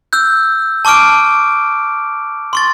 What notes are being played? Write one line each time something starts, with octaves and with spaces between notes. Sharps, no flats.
E6 F#6 G6
A5 C#6 D6 F6 D7
C6 C#6 A6